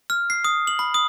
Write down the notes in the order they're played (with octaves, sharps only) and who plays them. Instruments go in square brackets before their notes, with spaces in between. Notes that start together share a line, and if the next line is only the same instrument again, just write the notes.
[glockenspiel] F6
C7
D#6
F#7
B5
D#6